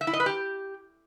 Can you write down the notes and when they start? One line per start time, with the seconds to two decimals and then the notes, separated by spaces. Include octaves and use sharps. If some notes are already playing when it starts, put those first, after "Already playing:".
0.01 E5
0.07 E4
0.13 D#5
0.20 B4
0.26 G4